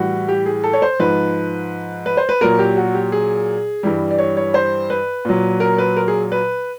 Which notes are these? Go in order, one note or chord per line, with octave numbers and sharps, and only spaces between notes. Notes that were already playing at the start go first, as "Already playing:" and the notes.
Already playing: A2 E3 G3 F#4
G4
G#4
A4
C#5
C5
G#2 F3 B4
B4
C5
B4
A#2 F#3 A#4
G4
F#4
G4
G#4
G2 E3 G3
D5
C#5
C#5
C5
B4
A#2 F#3
A#4
B4
A#4
G#4
B4